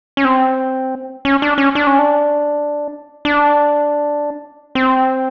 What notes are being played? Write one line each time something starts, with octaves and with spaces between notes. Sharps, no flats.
C#4
C4
C#4
D4
C#4
D4
C#4
D4
D4
C4